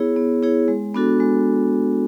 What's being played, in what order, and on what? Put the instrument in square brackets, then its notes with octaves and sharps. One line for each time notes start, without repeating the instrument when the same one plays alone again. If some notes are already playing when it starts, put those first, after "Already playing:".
Already playing: [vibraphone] B3 E4 G#4 C#5
B3
E4 G#4 C#5
G#3
B3 D4 F#4 A4
G#3